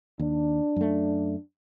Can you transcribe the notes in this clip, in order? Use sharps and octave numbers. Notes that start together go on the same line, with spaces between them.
D#2 D4
F#2 A3